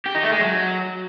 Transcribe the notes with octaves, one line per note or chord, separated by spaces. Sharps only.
G4
D#4
A3
G#3
F#3